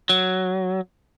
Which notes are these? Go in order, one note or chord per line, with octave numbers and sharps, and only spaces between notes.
F#3